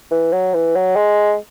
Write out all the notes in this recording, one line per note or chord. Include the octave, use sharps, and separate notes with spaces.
E3
F#3
E3
F#3
G#3